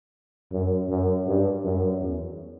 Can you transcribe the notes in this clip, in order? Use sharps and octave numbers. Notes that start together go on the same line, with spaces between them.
F#2
F#2
G2
F#2
E2